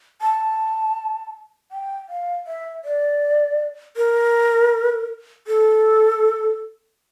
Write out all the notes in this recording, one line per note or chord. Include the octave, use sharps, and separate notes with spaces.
A5
G5
F5
E5
D5
A#4
A4